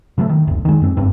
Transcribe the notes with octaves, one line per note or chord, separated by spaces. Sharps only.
C#3 F#3 G3 A3
D#3
F#1 D2
D#3 G#3
F#2 C4
F#1 G2 C4